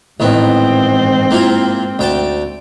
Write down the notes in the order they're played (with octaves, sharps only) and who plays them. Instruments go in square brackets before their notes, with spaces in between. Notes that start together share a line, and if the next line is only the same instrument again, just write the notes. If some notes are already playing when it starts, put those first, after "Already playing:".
[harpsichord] A1 D#3 B3 [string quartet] G#2 C4
[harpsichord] A#3 E4 F4
D2 G5 A5